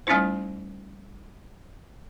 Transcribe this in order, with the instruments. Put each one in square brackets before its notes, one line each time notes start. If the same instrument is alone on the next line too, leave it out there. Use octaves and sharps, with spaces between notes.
[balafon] G3 A3 C#4 D#4 E4 C5